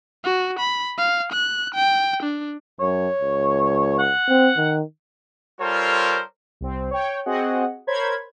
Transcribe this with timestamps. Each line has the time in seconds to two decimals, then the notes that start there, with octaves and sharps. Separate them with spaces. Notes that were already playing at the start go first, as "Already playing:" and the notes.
0.24 F#4
0.60 B5
0.98 F5
1.33 F#6
1.75 G5
2.23 D4
2.80 F#2 C#5
3.22 C#2
3.99 F#5
4.29 C4
4.57 D#3
5.60 G3 F4 A4 A#4 C5 C#5
6.61 C2 C4
6.91 C#5 G5
7.26 C4 F#4 G#4 D#5 F#5
7.87 A#4 C5 C#5 B5 G#6